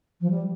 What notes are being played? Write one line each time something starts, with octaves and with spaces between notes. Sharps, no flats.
F3
G3